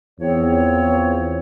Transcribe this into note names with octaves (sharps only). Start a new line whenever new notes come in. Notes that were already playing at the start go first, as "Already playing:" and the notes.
E2 F3 C4 C#5